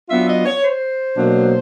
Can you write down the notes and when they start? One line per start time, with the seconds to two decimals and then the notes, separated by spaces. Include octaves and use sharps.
0.08 F#3 B3 D4 F4 E5
0.27 D#5
0.45 C#5
0.63 C5
1.15 B2 F#3 A#3 D4